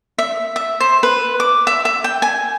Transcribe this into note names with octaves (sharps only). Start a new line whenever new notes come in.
E5
E5
C5
B4
D6
E5
E5
G5
G#5